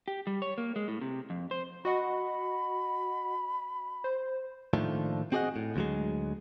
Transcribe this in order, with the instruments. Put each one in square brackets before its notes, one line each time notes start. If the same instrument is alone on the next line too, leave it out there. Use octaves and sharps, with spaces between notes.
[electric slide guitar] G4
G3
C#5
A#3
G#3
A2
C3
F2
C5
[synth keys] F#4 D#5 F#5 [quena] B5
[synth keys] C5
[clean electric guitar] A2 D#3 F3 A3 A#3 D4
C4 F#4 G#4 C#5 D#5 F#5
A2
D2 F#3 G#3